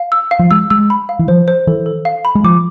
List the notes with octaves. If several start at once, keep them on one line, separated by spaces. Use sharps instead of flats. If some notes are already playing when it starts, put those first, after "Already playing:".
Already playing: F5
E6
F5
F3
G#3 E6
G#3 E6
B5
F5
E3
F3 C5
C5
E3 A4
A4
F5
B5
G#3
F3 D6